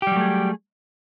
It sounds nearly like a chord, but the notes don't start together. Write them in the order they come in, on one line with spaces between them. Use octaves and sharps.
G4 G3 F#3 A3 G#4